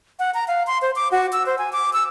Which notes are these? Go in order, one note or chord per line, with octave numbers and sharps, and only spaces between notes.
F#5
A#5
F5
C6
C5
D6
F#4
E6
C5
G#5
D6
E6